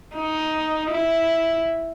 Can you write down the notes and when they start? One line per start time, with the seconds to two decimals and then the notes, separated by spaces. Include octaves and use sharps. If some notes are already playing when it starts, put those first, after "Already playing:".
0.16 D#4
0.90 E4